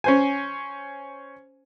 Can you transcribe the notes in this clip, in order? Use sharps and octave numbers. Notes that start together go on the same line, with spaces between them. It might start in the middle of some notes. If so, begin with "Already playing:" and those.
C#4 C5 G#5